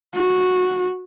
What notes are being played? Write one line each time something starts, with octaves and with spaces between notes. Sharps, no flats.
F#4